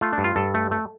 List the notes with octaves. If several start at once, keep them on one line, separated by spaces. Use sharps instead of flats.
A3 F4
D4
G2
F4
G2 A4
A3
A3